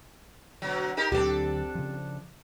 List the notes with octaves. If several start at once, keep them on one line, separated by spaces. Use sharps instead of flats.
B2 D3 F#3
D#4 G4 A#4
D2 D3 F#3 C4 D4 G4 A4
C#3 F3